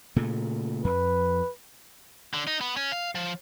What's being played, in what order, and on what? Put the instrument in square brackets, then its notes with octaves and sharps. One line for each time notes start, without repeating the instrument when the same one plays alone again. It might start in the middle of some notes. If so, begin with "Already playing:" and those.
[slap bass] A#2 C#3 A3
[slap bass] F2 [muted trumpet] B4
[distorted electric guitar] D3
D#4
B3
C#4
F5
F3